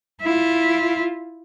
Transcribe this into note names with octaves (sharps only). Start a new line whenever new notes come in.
E4 F4